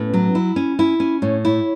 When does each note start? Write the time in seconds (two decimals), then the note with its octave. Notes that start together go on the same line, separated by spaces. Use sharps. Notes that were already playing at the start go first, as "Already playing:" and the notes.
Already playing: A2 B3 C#4 B4
0.13 F#3
0.35 E4
0.56 C#4
0.79 E4
1.00 C#4
1.22 A2 C#5
1.45 E4